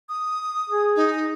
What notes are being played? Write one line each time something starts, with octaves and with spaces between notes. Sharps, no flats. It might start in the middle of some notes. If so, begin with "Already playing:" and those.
D#6
G#4
D#4